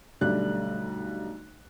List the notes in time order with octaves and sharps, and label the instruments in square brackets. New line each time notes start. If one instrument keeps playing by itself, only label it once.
[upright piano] B1 D3 G3 A3 D5 F#6